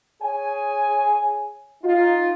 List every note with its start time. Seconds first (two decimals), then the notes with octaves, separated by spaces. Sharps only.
0.23 G#4 C#5 G#5
1.84 D#4 F4